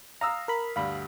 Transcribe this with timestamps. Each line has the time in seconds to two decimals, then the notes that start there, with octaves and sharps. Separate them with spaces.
0.21 F5 A#5 D#6 E6
0.48 A#4 B5
0.76 D2 G2 F5 B5